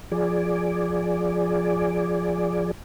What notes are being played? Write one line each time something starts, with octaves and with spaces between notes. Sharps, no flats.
F3 G#4 D5